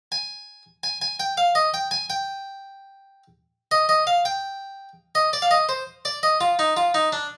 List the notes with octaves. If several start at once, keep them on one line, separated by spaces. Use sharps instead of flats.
G#5
G#5
G#5
G5
F5
D#5
G5
G#5
G5
D#5
D#5
F5
G5
D#5
D5
F5
D#5
C5
D5
D#5
F4
D#4
F4
D#4
D4